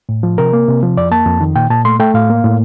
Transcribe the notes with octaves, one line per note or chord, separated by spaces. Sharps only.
A2
F3
C3 A#4
A#3
C3
F3
F2 D5
A#3 A5
F2
D#3
A#2 G5
A#2 A5
A3 C6
A3 G5
A2 F5
A#3
A2